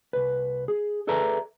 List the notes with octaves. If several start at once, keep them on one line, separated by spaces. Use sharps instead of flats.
C2 B4
G#4
G#4 A4 B4 D5 E5 A#5